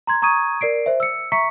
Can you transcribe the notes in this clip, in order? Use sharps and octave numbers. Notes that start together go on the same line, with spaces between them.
A#5 C6 G#6
A#5 C#6 D#6 G#6 D#7
A#4 D5 C7 D7
C5 E5
E6 C#7
E5 A#5 C#6 B6 C#7